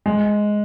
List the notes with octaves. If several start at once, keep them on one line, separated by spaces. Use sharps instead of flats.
G#3